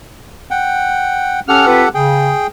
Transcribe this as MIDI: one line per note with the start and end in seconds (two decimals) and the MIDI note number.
0.51 1.40 78
0.51 1.40 79
1.49 1.62 61
1.49 1.89 67
1.49 1.89 69
1.49 1.89 78
1.49 1.62 89
1.66 1.83 60
1.66 1.83 65
1.66 1.83 71
1.94 2.31 49
1.94 2.47 68
1.94 2.47 79